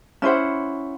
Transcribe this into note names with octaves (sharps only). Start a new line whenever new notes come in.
C#4 E4 C5 F#5